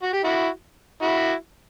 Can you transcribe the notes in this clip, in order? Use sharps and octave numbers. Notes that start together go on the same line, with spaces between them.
F#4
G4
E4 F#4
E4 F#4